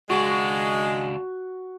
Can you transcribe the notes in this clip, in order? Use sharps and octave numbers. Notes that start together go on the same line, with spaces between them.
C#2 G#3 D4 F#4